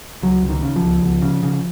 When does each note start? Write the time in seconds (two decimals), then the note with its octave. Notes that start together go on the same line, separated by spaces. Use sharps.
0.22 C#2 F#3
0.43 C#2
0.49 D#3
0.62 C#3
0.76 F3
0.82 C#2
1.02 C#2
1.22 C#3
1.43 C#3